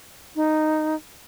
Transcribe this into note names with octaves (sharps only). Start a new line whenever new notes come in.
D#4